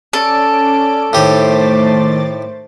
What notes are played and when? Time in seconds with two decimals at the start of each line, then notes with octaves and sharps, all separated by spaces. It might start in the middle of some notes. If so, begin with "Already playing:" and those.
0.13 C#4 A4 D5 D7
1.13 A2 D#3 A3 G4 C5 D6 A6